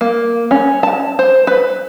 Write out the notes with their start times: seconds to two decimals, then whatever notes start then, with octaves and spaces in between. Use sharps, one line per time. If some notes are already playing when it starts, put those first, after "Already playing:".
0.01 A#3
0.51 C#4
0.83 A5
1.19 C5
1.47 B4